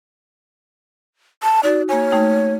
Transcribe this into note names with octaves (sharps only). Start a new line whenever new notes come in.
A5
D#4 F#4 D5
A#3 C#5 G#5
A3 D#4 G5